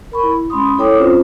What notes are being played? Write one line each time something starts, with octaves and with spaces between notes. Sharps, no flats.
A#4 B5 C#6
E4
G#3 C#4 B5 C6 D#6
E4 A4 C#5 G5 D6 D#6
C4 C#4 F4 C5